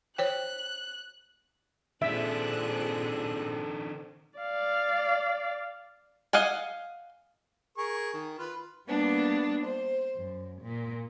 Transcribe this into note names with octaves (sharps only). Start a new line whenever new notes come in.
C5 C#5 G5 F#6
A#2 D#3 C4 D4 G#4 A4 E5 F#6
D5 F5
D#5 F5 F#5 G#5
G#4 A#4 C#6
D#3
F4 B4
G3 A#3 B3 D4
C5
F#2
A#2